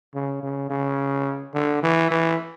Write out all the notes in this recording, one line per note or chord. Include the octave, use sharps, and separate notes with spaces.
C#3
C#3
C#3
D3
E3
E3